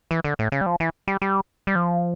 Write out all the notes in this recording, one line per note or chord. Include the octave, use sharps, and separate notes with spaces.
E3
D3
A2
C#3
G3
F3
E3
G3
G3
G3
F3